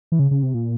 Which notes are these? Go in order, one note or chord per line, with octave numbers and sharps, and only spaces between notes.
E3
C#3
C#3
C3
A#2